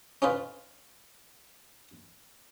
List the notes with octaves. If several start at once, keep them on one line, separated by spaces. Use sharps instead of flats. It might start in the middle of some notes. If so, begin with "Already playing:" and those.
C#4 D#4 F4 B4